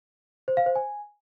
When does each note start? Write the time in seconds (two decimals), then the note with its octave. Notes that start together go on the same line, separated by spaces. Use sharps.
0.48 C5
0.57 F5
0.66 C5
0.75 G#5